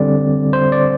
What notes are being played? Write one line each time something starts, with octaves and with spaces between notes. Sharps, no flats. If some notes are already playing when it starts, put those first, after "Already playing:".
Already playing: D3 G3 C4 D5
C5
D5